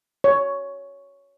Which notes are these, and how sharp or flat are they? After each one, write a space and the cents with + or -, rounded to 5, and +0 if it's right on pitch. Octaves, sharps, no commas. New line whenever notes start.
C#5 +10